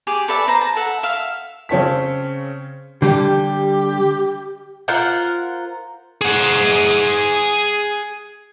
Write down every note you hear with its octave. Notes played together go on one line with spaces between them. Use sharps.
G4 G#4 D6
A4 B4 D5 E5
B4 C5 A#5
A5
A4 E5 F#5
E5 F5
C#3 C4 C#4 C#5 A5 B6
D3 G3 G4
F4 A#4 C5 F#5
G#4 F#5